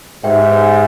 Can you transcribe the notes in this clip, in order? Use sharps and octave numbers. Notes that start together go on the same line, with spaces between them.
G#2 G4 B4 E5 G5